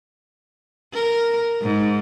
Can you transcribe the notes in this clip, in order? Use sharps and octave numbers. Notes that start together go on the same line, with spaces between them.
A#4
G#2